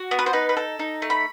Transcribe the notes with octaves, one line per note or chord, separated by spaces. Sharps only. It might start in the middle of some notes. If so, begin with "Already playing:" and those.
Already playing: F#4
B3
B4
C5
D#4 B4
B4
A4
D#4
A3
B5